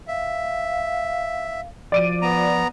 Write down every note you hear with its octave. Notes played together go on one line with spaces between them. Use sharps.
E5 F5
F3 D5 D7 D#7
B3 A#5